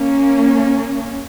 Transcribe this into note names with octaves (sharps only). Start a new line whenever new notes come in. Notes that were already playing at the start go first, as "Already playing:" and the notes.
Already playing: A#3 C#4